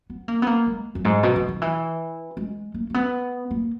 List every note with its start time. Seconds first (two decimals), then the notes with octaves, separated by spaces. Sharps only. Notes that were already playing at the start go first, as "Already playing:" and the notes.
0.10 B3
0.28 A#3
0.42 B3
0.47 A#3
0.67 G#3
0.95 F#2
1.05 G#2
1.23 B2
1.36 C#3
1.48 D#3
1.62 E3
2.37 G#3
2.74 A#3
2.90 A#3
2.94 B3
3.51 A#3